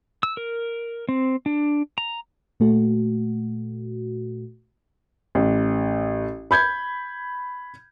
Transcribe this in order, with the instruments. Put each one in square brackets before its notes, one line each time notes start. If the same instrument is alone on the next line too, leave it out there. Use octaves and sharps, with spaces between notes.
[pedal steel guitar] E6
A#4
C4
D4
A#5
[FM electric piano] A#2 A3 F#4
[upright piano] A1
B5 G6 G#6